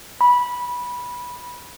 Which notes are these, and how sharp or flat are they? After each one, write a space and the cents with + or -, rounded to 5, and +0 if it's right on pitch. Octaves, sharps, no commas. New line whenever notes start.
B5 -15